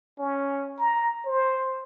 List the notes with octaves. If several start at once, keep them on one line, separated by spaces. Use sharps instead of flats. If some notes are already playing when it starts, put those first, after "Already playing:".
C#4
A#5
C5